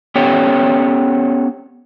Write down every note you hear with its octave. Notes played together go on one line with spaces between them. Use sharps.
B3 C#4 G4 A4 C#5 G5